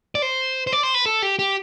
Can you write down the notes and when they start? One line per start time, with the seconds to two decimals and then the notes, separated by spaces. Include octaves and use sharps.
0.15 D5
0.22 C5
0.67 C5
0.72 D5
0.83 C5
0.94 B4
1.06 A4
1.22 G4
1.39 G4